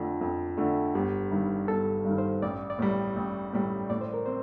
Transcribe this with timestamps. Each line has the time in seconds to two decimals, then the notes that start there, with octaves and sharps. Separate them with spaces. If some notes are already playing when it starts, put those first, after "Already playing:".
Already playing: F2 D3 A3 F4
0.21 F2
0.57 D3 A3
0.95 G1 G4
1.31 G2 D#3
1.68 G1 A4
2.05 G2 D#3
2.18 C5
2.42 A1 D5
2.70 D5
2.79 A2 G3
3.16 A1
3.53 A2 G3
3.90 A2 D5
4.01 C5
4.14 A#4
4.26 C4 C5